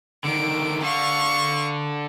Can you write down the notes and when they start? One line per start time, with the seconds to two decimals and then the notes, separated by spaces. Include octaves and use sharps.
0.24 D3 D#3 D7
0.82 D3 F5 C#6